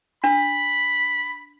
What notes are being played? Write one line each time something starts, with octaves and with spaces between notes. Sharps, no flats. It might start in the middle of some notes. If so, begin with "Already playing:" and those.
D4 B5